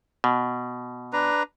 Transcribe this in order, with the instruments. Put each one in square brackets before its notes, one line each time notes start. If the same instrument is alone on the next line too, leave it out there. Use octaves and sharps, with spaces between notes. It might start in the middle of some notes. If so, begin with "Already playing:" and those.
[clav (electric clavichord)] B2
[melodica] D4 B4 A#5